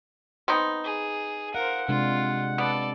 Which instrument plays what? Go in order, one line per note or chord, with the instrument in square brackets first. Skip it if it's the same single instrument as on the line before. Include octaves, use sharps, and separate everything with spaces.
[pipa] B3 C4 D#4
[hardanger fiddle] G#4
[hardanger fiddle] A#4 C5 [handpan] F5 [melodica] F#5
[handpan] C3 G#3 D4 [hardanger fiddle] F4
[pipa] B3 [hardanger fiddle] A4 D5